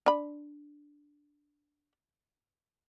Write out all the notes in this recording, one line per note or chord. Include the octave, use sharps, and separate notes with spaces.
D4 B5